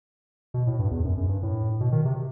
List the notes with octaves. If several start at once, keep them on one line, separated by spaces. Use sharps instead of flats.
B2
A2
G2
E2
F#2
F#2
G2
A2
B2
D#3
C3